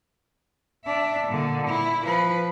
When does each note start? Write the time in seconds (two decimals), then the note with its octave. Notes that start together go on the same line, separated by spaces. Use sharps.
0.85 D4 E5
1.28 A#2 D3
1.67 E4
2.04 F3 B4